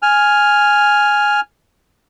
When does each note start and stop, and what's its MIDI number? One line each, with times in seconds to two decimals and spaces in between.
0.02 1.40 80
0.02 1.40 89